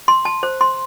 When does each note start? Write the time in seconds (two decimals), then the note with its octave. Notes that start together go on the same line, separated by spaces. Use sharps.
0.08 C6
0.25 A5
0.43 C5
0.61 C6